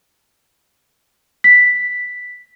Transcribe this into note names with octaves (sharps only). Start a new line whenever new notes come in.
B6